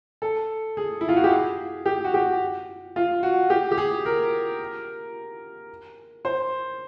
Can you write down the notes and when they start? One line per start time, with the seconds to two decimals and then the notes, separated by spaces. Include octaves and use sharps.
0.22 A4
0.77 G#4
1.01 E4
1.09 F4
1.16 F#4
1.24 G4
1.31 G#4
1.86 G4
2.04 F#4
2.14 G4
2.96 F4
3.23 F#4
3.50 G4
3.72 G4
3.78 G#4
4.05 A#4
6.25 C5